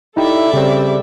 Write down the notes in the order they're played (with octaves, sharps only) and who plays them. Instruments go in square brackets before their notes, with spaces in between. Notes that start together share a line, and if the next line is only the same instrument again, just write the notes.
[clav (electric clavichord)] D#4 G4 [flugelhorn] E4 [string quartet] A4 D5 E5
[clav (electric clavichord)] C#3 C4 [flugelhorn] G3